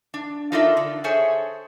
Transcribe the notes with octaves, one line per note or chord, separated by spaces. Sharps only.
D4
D#4 F4 A4 A#4 D5 E5
D3
G#4 A4 C5 C#5 E5 G#5